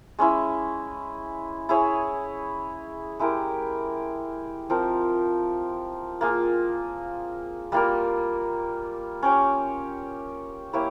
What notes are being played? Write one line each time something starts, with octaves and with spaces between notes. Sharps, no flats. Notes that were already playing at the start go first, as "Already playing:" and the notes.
G#3 C#4 E4
E4 G#4 C#5
G#3 E4 G4 A#4
F3 C4 F4 A#4
A#3 F4 G#4
G3 A#3 F4 A#4
C#4 G4 C#5
A#3 E4 G4 C#5